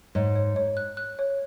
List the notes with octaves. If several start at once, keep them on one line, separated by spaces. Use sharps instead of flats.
G#2 C#5
C#5
C#5
F#6
F#6
C#5